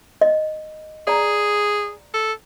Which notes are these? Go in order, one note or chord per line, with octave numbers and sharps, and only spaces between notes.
D#5
G#4 D5 A#5
A4